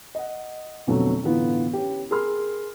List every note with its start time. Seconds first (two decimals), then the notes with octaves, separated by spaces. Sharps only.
0.15 D#5 F#5
0.87 F2 B2 D3 F#3 A3
1.23 A2 D3 E3 B3 F4
1.73 C#4 G4
2.11 G#4 A#4 B5 C6 F6